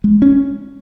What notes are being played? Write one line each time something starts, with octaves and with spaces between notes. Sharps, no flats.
G#3
C#4